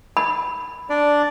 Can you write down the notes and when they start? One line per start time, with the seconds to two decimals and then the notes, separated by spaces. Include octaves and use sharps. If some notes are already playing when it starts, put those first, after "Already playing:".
0.17 B5
0.90 D4 D5